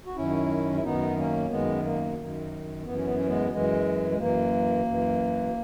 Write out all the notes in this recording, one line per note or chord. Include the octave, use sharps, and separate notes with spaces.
F#4
F#2 D#3 C#4 E4
E4
F#2 D#3 B3 D#4
A#3 C#4
F#2 D#3 G#3 B3
A#3
F#2 D#3
F#2 E3 B3
C#4
B3
C#4
G#3 B3
F#2 E3 G#3
G#3
F#2 E3 A#3
F#2 E3